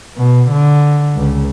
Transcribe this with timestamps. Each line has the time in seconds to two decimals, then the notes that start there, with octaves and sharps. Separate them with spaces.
0.17 B2
0.51 D3
1.16 C#2